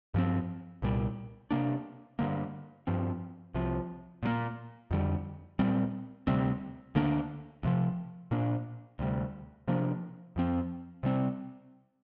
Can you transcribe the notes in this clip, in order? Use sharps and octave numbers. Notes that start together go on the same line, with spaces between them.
G2 F3 C4
C2 A#2 G3
C3 A#3 D4
G2 D3 A#3
G2 F3 C4
C2 C3 F3
A#2 F3 A#3
F2 D3 G3
A#2 G3 C4
D2 C3 G3 C4
D2 D3 A#3 D4
D2 C3 F3
A#2 A#3 D4
D2 C3 G3
C3 F3 A#3 D4
F2 F3 C4
C3 G3 C4